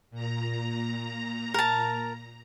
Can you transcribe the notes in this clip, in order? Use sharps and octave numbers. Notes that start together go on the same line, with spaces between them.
A#2 A#5
A#4 A5